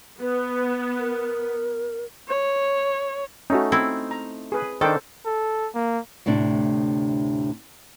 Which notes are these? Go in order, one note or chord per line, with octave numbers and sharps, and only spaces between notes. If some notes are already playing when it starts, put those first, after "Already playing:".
B3 B4
A#4
C#5
A3 C#4 D#4 F#4
C4 E4
A#5
G#4 B4
D#3 D4 A4 C5 G5
A4
A#3
D2 A2 C3 D4